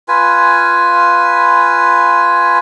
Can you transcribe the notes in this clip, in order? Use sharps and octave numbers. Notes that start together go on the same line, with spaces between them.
F4 B4 G#5